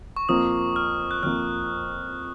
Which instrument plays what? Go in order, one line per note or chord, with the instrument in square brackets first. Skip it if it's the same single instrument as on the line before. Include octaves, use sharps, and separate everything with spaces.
[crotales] C#6
[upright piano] F2 F3 A#3 [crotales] D#6
[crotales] F6
F#6
[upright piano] F2 F3 A#3 [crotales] F6